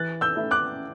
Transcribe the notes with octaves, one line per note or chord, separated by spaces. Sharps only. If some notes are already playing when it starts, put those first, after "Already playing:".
Already playing: E3 F#6 A6
E6 G6
A3 E4
D6 F#6